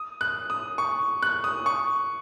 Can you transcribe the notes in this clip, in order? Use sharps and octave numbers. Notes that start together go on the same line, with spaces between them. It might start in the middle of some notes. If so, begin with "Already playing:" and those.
Already playing: D#6
F#6
D#6
C#6
F#6
D#6
C#6